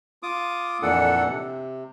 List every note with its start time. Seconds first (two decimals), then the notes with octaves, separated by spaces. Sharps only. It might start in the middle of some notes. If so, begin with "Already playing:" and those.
0.23 F4 D6 D#6
0.82 F2 A#2 E3 D4 A4 F#5
1.29 C3